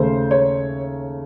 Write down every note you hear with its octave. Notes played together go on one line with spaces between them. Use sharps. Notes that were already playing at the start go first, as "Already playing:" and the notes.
Already playing: D#2 C#3 A3 C5
C#5